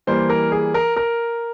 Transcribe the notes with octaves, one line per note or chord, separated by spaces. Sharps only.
E3 G3 A#3 C5
A#4
G#4
A#4
A#4